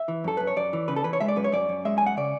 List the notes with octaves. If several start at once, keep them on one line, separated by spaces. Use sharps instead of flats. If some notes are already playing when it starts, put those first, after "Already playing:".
Already playing: E5
E3
F#2 A4
F#2 B4
C#5
F#2 D5
E3
C#3 B4
A4
E3 B4
C#5
G#3 E5
D5
F#2 B4
C#5
F#2 D5
F#2
G#3 E5
F#2 G#5
F#5
C#3 D5